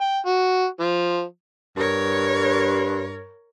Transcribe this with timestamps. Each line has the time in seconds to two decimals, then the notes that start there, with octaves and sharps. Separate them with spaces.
0.01 G5
0.26 F#4
0.80 F3
1.77 G2 A#4 C#5